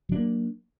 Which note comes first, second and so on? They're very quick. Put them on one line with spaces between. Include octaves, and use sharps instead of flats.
F#3 D4 A#3